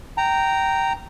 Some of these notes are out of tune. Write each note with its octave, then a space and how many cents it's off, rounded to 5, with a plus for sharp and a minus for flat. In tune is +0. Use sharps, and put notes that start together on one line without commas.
G5 -15 A#5 -10